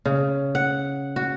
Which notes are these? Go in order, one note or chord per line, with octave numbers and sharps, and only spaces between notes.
C#3
F#5
F#4